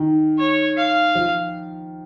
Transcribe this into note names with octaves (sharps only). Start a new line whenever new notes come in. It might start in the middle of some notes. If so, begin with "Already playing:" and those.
Already playing: D#3
C#5
F5
F3